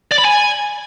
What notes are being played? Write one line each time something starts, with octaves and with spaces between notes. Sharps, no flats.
D5
B5
G#5